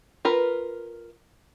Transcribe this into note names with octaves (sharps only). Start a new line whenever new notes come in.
F4 A#4 B4